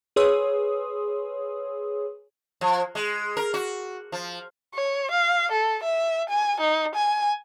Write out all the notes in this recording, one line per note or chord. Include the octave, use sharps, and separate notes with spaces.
G#4 B4 C#5 C6 D#6 E6
F3
G#3
A#4
F#4
F3
C#5
F5
A4
E5
G#5
D#4
G#5